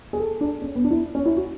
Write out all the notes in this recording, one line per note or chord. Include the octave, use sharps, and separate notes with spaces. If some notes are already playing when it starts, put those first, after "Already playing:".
G#4
A4
D4
C#4
B3
D4
E4
C#4
E4
F#4